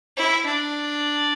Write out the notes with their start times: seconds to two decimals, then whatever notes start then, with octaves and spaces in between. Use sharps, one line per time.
0.16 E4
0.45 D4